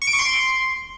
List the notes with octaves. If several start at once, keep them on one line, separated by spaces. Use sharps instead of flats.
C#6
D7
C#6
C6